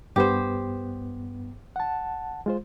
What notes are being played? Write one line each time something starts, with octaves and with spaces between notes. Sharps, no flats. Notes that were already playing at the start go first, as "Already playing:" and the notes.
G2 B3 G4 C5
F#5 A5
G#3 F4 C5